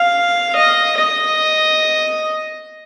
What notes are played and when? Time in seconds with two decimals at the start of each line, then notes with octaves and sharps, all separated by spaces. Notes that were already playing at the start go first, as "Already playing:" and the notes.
Already playing: F5
0.56 D#5
0.98 D#5